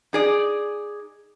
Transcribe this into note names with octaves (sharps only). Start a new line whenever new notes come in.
D#4 G#4 D5